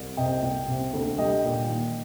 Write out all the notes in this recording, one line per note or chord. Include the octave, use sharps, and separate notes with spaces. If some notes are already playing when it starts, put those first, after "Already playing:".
Already playing: C2
C3 D#5 G5
C2
C3
D2
G3 D#5 G5
A#2
D#3